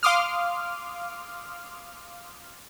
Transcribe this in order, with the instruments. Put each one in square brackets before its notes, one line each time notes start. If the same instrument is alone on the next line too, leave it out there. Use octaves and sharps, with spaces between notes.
[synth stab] F5 C6 D6 D#6 F6